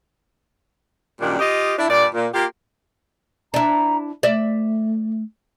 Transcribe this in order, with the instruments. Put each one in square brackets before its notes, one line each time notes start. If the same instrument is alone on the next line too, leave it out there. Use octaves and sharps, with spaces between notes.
[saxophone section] F#2 A#2 D#3 G3 D4
F4 G4 D#5
D4 E4
G2 A#2 D5
A#2
A#3 F4 G4
[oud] D4 E4 [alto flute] A#5
[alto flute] A3 [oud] D5 E5